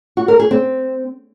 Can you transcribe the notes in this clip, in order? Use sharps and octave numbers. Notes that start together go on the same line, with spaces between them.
F#4
A#4
G#4
C4